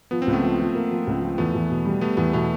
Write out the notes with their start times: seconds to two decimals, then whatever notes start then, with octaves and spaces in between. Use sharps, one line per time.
0.11 F3 B3
0.22 C4
0.27 C#2
0.33 A3 B3
0.43 F3
0.59 F3
0.75 A#3
0.91 F3
1.07 C#2
1.22 F3
1.38 E2 A3 B3
1.55 E2
1.70 B2
1.85 G3
2.01 G3 A3 B3
2.17 E2 A3 B3
2.33 B2 A3 B3